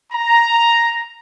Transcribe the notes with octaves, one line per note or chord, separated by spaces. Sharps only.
A#5